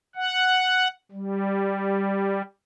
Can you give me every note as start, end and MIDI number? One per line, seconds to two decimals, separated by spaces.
0.15 0.88 78
1.12 2.42 55